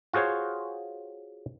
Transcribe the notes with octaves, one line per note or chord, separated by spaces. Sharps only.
F4 F#4 G#4 C5 C#5